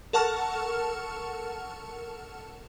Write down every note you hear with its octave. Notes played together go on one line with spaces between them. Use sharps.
A4 A#4 F#5 A5 C#6 F6